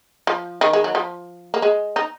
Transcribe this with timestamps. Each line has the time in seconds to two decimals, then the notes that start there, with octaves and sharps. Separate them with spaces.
0.27 F3
0.61 D#3
0.73 G#3
0.84 F#3
0.95 F3
1.54 A#3
1.62 G#3
1.96 D#4